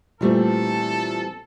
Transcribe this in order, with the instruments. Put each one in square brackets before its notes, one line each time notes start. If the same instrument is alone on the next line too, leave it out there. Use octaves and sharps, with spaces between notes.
[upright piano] A#2 A3 [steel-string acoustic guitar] E3 G3 C4 [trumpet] A4